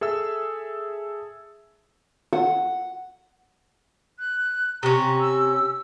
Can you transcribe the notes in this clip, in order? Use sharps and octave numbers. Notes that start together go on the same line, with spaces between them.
G#4 A4 E5 E6
F#5
F#6
C3 C#4 A#5
E6